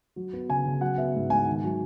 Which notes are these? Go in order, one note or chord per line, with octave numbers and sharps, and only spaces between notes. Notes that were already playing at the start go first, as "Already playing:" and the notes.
F#3
B3
C#3 G#5
C#3
F#3 F#5
B3 E5
G#2
G#2 G#5
D#3
F#3